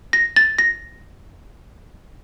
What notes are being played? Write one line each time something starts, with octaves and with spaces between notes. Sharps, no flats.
A#6
A6
A#6